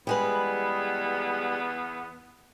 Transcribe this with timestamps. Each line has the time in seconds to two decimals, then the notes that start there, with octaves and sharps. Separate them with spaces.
0.07 E2 G3 G#3 B3 B4